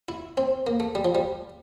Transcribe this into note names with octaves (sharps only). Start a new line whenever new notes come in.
E4
C4
A#3
A3
G3
F3
G3